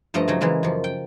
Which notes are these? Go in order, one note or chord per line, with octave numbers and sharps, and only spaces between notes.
G2 F3 A3 D#5 A#5
C#3 F3 F#3 D#4
C#3 E3 G#3 A#3
F#2 F3
G5